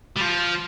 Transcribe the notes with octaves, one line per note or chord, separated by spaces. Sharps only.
G3
F3